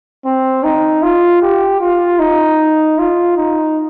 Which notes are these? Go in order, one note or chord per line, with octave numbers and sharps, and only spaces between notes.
C4
D#4
F4
G4
F4
D#4
F4
D#4